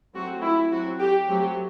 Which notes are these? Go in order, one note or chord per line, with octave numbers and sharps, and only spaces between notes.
F#3 A3 C4 F#4
E4
F#3 C4 F#4
G4
F#3 A3 C4 G4